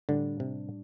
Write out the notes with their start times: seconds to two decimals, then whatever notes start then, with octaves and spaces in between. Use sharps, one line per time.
0.09 A2 D3 G3 D4
0.40 C3